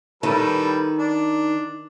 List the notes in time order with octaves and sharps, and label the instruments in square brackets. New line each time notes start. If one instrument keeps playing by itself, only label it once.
[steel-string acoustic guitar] D#3 [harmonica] G3 A4 B4
[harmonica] D4